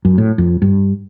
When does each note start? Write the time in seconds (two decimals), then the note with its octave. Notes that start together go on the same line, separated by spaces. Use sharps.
0.05 F#2
0.18 A2
0.38 F2
0.62 G2